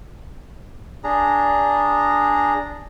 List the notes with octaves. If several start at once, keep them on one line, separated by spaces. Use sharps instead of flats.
D4 G#4 A#5